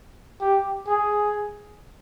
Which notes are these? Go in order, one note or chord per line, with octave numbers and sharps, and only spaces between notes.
G4
G#4